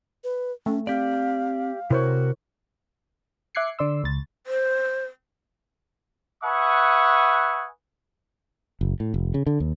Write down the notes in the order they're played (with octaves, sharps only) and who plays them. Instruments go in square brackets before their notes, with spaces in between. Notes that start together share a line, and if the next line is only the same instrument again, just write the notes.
[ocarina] B4
[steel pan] A3 [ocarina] C#4
[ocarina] C4 [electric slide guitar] G4 D5 [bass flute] F5
[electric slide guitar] C3 F#4 [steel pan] E4 C5 C#5 [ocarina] A#4
[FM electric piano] E5 D6 F#6 G#6 C7 C#7
D3 D5 C6 E6
C#2 A6
[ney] C5
[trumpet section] B4 E5 F#5 G#5 C#6 D#6
[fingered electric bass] F#1
A2
F1
C#3
D3
D#2